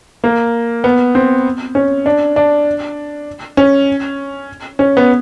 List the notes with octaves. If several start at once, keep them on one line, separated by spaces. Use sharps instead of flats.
A#3
B3
C4
C#4
D4
D4
C#4
C#4
B3